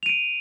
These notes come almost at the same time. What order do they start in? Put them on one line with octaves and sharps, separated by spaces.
F7 D#7 D7